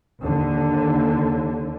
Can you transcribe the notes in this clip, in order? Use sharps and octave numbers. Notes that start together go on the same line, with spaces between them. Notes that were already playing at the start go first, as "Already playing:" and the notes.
D#2 D3